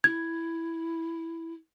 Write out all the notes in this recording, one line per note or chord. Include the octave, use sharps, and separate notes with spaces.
E4 G#6